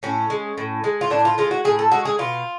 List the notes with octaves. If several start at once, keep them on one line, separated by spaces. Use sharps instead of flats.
A2 C#4
G#3
A2
G#3
F4
A2 D4
F4
G#3 F4
F#4
A2 G#4
A4
G#3 F#4
G#4
B2 F4